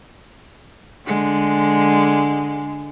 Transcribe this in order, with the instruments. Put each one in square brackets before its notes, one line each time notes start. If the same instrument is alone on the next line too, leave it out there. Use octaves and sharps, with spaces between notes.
[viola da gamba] D3 G#3